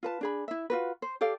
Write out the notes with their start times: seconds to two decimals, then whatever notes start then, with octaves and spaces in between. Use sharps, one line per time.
0.03 F4 B4 A5
0.21 D4 G#4 B5
0.48 E4 E5
0.70 F4 F#4 B4
1.02 C5
1.21 G4 A4 D5 F5